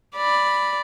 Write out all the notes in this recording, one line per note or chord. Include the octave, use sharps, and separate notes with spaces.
D5 B5